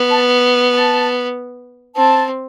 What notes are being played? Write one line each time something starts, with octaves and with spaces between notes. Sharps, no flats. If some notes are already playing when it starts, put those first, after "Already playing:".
Already playing: B3
A5
A5
C4 A5